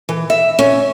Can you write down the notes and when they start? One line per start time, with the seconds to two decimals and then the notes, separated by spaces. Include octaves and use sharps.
0.09 E3
0.30 E5
0.59 C#4